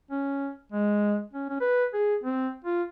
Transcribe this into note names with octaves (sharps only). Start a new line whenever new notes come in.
C#4
G#3
C#4
C#4
B4
G#4
C4
F4